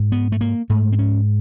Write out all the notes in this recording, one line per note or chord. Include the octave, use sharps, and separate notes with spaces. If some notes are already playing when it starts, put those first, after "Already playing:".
Already playing: G#2
B3
A3
A#3
G#2 A3
C4
C#4